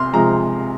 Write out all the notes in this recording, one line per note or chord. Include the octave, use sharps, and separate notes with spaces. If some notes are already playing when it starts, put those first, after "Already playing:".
Already playing: C3 C6 F6
C3 F3 G#3 A#5